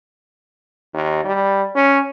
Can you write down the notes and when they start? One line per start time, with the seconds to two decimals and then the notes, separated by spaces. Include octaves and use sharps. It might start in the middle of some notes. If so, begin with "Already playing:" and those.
0.94 D#2
1.24 G3
1.76 C#4